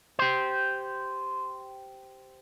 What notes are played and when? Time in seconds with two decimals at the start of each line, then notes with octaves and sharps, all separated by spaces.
0.19 G4 C5